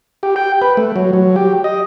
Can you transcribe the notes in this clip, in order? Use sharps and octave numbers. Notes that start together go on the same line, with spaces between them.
G4
G5
B4
A3
F#3
F#3
G4
D#5